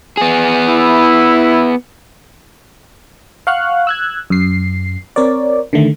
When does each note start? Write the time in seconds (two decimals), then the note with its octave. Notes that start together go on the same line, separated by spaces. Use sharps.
0.17 B3 G#4
0.68 E4
3.47 F5 F#5 C#6 F6 F#6
3.87 E6 F#6 G#6
4.30 F#2 C7
5.16 C4 A#4 C#5 D5
5.73 D3 D#3 A3